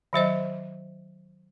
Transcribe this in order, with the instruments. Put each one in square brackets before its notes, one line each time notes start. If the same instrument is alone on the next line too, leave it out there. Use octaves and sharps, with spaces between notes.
[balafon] D#3 F#3 C5 D#5